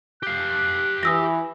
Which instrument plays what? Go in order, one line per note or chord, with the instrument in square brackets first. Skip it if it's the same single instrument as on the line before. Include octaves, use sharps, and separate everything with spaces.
[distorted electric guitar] G4 F5 [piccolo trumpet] F#6
[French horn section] E3 [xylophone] D#6 E6 A#6